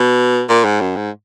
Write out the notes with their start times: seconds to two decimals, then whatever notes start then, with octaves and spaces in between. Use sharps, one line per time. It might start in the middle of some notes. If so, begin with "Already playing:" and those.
Already playing: B2
0.49 A#2
0.65 G#2
0.81 F#2
0.96 G#2